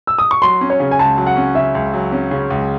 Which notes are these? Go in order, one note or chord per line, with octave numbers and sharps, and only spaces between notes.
E6
D#6
C#6
F#3 C6
C#4
C#5
C#3
G#5
C#2 A5
F#3
F#5
C#4
C#3 E5
C#2
F#3
C#4
C#3
C#2